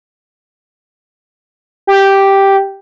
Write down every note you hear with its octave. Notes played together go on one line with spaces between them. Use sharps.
G4